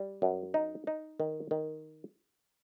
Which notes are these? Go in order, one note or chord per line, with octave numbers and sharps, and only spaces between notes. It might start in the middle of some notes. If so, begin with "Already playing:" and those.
Already playing: G3
F#2
D#4
D#4
D#3
D#3